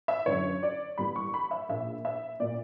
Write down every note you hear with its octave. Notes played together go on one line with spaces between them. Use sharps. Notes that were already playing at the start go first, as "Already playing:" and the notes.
E5
F#2 D3 F#3 C#5
D5
G1 G2 E3 G3 A#3 B5
C#6
B5
E5
A#1 A#2 A#3 E5
E5
A#2 A#3 D5